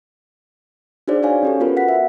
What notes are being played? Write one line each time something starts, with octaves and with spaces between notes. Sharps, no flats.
D4 D#4 F#4 G#4 C5 D5
C5 C#5 F5 G#5
C#4 G4 A4
B3 F4 F#4 A#4 B4
F#5 B6
E5